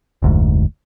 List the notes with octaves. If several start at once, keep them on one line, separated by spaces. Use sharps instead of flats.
F1 D2 G#2